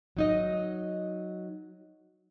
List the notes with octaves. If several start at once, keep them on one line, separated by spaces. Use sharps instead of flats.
F#3 D#4 D#5